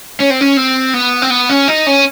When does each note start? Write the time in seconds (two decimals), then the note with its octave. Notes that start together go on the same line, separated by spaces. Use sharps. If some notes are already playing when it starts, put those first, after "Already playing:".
0.20 C#4
0.30 C4
0.41 C#4
0.57 C4
0.94 B3
1.22 C4
1.30 B3
1.49 C#4
1.68 D#4
1.87 C#4